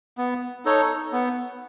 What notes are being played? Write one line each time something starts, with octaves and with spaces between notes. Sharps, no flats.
B3
D#4 A4 C#5
B3